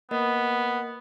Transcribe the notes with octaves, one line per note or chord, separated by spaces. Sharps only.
A#3 B3 A#4 D#5